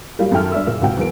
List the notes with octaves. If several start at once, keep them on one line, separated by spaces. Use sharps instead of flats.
F#3 G3 A#3 F4
F#2 D#3 A4 E5 G5 F6
G2 D5 E5 E6
F#1 A#2 E6
C#2 C3 F#4 F#5 G5
E2 F#3 A#4 D7